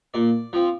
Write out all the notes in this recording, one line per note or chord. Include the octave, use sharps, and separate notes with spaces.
A#2 D5
F3 C4